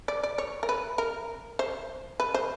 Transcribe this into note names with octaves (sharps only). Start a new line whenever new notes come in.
D5
D5
C#5
A#4
B4
A#4
C5
B4
C5